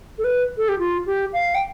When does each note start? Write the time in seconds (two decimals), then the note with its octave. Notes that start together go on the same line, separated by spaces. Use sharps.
0.18 A4
0.24 B4
0.57 A4
0.69 G4
0.79 F4
1.06 G4
1.33 F5
1.55 G5